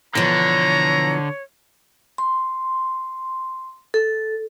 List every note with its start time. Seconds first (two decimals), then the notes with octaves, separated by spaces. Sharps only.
0.15 B2 D3 E3 F3 C#5 A#5
2.18 C6
3.94 A4